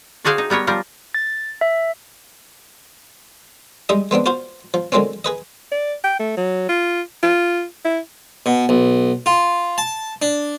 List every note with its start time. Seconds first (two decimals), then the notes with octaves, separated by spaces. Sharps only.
0.24 D4 F#4 G#4 C5 F5 G5
0.38 D#4
0.50 G3 B3 A#4 C#5
0.67 F3 G3 F4 A#4
1.14 A6
1.61 E5
3.89 G3 G#3 D#4 G4 D#5
4.11 G#3 B3 C4 D4
4.26 F4 F#4 C5 F5
4.74 F3
4.92 D3 F#3 G#3 A#3 C4 C#4
5.25 G#4 B4 D#5
5.72 D5
6.04 G5
6.19 A3
6.37 F#3
6.69 F4
7.23 F4
7.85 E4
8.46 B2
8.69 B1
9.26 F4
9.78 A5
10.22 D4